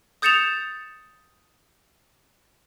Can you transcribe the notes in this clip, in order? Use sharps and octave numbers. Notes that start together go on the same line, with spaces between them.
D#6 G6 A6 C#7 E7 F7